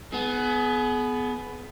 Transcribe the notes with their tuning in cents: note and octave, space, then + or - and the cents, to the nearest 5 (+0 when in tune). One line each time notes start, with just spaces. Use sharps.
B3 +10 G#4 +35